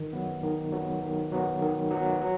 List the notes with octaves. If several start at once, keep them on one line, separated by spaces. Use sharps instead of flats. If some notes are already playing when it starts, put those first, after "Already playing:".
Already playing: D#3
F#3 B3
D#3
F#3 B3
D#3
F#3 B3
D#3
F#3 B3
F#3